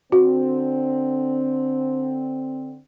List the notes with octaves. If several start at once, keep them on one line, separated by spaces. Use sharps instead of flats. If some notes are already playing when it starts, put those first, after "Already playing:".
D3 C4 F#4